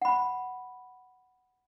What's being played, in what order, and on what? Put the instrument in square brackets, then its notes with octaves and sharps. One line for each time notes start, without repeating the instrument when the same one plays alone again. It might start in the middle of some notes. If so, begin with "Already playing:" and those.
[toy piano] F#5 B5